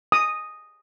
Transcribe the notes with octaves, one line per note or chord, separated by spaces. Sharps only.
D#6